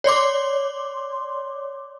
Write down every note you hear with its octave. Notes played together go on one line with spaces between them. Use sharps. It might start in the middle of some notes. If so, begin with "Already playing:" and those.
C#5 D5 C6 D6